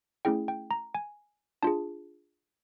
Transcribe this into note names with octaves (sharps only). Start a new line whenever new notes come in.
A3 C#4 E4 G#4 G5
G5
A#5
G#5
D4 F4 G#4 A5